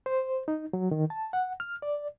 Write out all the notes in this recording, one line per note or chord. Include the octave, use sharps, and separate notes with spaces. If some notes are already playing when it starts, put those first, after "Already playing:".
C5
D#4
F#3
D#3
A5
F#5
F6
D5